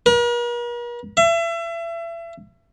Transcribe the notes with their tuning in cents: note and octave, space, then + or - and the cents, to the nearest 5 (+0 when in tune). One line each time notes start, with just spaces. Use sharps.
A#4 +45
E5 +35